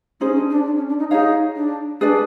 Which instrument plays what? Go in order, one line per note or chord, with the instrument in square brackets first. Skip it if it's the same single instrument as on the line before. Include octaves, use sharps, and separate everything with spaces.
[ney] C#4 [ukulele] D#4 G#4 C5
[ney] D4
D4
D4
C#4
D4
D#4
[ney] D#4 [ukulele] G#4 C#5 F5
[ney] D4
[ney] D4 [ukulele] G#4 B4 D5